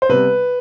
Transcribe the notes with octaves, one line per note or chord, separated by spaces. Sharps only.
C5
C3 G3 B3 B4